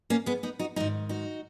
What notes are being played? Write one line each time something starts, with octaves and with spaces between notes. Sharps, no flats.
A#3 C#4
G#3 B3
B3 D#4
D#4 F#4
G#2 D#3 D#4 F#4
D#4 F#4